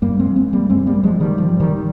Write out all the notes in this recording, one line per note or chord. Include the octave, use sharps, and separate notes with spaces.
G2 G3 A#3
G#3 C4
G#3 C4
G3 A#3
G2 G#3 C4
G3 A#3
F3 G#3
D#3 G3
G#2 F3
D#3 G3